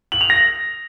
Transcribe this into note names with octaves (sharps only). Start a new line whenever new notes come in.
F#7
F7
A#6